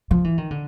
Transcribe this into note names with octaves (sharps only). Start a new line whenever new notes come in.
F3
E3
D#3
D3